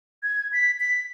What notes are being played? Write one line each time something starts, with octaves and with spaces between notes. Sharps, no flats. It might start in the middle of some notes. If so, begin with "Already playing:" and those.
G#6
B6
B6